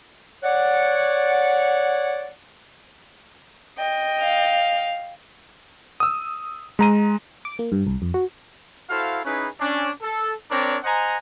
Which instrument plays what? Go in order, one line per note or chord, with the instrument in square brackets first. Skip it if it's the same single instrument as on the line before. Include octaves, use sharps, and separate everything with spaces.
[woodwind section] C#5 D5 F#5
[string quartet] D#5 G5
[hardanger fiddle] F5
[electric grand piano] D#6 E6
G#3 A#5 D#7
[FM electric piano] D6
A#3
G2
C2
F2
F#4
[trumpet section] E4 F#4 A4 C5 F5
C#4 D#4 E4 G#4 B4
C#4 D4
A4
C4 D4 A#4 C#5 D5 A#5
C5 D#5 F#5 G#5 A#5